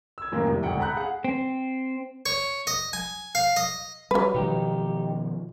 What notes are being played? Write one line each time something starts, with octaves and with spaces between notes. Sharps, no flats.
E6 G#6
F#2 A2 D#3 E3 A#3
F2 A2 C3 E3 G3
E1 D2 G#2 F#5 G5
A4 F#5 A#5 B5 F#6 G6
G#4 F5 F#5
C4
C#5
D#5
G#5
F5
D#5
F#3 G3 B4
B2 D#3 F3 D#4 G4